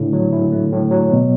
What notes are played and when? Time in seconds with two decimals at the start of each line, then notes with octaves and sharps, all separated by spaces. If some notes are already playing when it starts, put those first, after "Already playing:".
Already playing: A2 D3
0.13 F#3
0.33 E4
0.52 A3
0.72 A2
0.91 F#3
1.11 B2